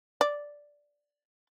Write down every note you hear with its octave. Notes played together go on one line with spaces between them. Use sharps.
D5